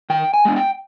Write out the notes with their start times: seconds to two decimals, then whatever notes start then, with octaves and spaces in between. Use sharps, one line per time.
0.10 D#3 G5
0.34 G#5
0.45 G#3 B3 D4
0.56 G5